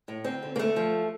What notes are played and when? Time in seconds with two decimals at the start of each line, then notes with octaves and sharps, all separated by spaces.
0.08 A2
0.24 D2 C4
0.43 D3
0.56 A#3
0.59 D2 A3
0.76 F3